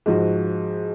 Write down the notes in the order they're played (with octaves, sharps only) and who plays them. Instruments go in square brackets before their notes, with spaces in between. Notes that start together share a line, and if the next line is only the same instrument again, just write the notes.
[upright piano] G#2 F3 F#4